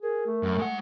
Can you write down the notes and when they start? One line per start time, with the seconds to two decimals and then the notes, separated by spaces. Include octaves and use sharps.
0.02 G#4 A#4
0.27 A3
0.43 F#2
0.58 G#3 F#5